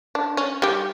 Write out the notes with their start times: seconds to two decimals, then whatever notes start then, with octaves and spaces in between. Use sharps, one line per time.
0.15 D4
0.37 C#4
0.62 G3 G4